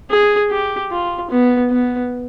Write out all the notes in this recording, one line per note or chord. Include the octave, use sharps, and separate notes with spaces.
G#4
G4
F4
B3
B3